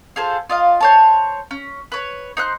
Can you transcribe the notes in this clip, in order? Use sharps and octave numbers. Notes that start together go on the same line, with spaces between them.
F4 G#4 A4 C5
F4 D#5 F5
C5 C#5 A5
C#4
B4 C#5
D#4 C5 F#6